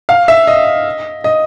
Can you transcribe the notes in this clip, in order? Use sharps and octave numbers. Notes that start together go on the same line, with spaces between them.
F5
E5
D#5
D#5